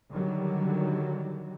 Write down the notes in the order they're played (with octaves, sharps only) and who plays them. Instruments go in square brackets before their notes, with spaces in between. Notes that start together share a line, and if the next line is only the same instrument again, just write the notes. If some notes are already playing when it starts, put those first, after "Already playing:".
[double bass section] D3 D#3 F#3 G3